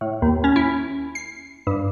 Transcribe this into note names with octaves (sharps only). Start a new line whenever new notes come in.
A2
D#2
C#4
E4
C7
G2